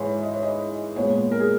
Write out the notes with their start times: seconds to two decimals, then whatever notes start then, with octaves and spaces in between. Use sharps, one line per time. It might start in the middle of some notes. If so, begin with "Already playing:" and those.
Already playing: G#2 E3 G#3 C#5
0.23 D#5
0.33 C#5
0.43 D#5
0.96 A#2 G#3 B3 C#5
1.31 A#4
1.40 G#4